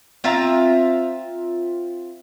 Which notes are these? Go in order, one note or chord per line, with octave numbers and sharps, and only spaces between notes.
C4 F4 E5 A#5